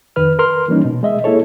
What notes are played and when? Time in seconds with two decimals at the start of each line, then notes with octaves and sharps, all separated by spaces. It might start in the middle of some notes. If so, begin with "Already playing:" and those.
0.16 F2 D#3 B4 F6
0.39 A#4 B4 C6 F6
0.68 E3 G3 A#3 C#4 D#4
0.85 B2
1.03 G#3 D#5 E5
1.24 A#3 E4 G#4 A4 C#5